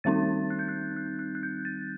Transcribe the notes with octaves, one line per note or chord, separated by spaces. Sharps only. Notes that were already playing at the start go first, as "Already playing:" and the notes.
D#3 G3 C4 D#4 A6
F#6
G6
F#6
F#6
F#6
F#6
G6
A6